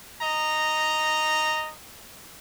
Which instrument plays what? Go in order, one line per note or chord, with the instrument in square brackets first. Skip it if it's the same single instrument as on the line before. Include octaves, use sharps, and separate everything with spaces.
[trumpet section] D#5 A#5